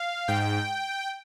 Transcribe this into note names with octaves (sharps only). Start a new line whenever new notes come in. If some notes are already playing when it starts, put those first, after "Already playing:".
Already playing: F5
G#2 G5